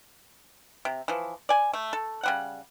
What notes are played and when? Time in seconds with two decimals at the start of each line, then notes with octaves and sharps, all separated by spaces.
0.85 C3
1.08 E3 F3
1.49 D5 G#5
1.74 A3
1.93 A4
2.23 C#3 G3 F#5